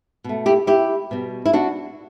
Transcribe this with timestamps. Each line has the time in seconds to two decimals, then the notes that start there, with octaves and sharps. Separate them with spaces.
0.24 B2 A3
0.46 E4 G4
0.67 E4 G4
1.11 B2 G3
1.46 E4
1.53 D4 F#4